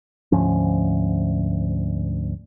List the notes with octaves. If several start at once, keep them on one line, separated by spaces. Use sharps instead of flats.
D2 G#2 F3 C#4